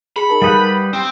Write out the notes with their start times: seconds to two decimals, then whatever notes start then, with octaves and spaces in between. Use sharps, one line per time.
0.16 G#4 B5 C#7
0.29 D#4 A#4 A5
0.42 G3 B4 F5 F#5 D#6 G6
0.93 C4